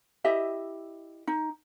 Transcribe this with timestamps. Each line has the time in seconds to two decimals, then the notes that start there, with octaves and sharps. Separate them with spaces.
0.24 E4 G4 D#5 E5
1.27 D#4